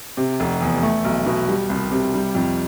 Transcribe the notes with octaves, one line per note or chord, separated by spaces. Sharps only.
C3
F1
E2
A3
B1
B2
G3
C2
C3
G3
F2